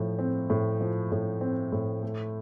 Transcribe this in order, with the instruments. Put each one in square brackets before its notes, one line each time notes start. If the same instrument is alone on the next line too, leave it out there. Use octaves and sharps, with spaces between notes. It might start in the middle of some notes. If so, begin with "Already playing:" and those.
Already playing: [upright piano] A2 F3
C4
A2
F3
A2
C4
A2
A3